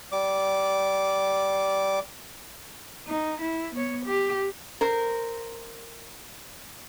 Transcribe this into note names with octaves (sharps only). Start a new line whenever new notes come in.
G3 D6
D#4
E4
B3 C#5
G4
A#4 C5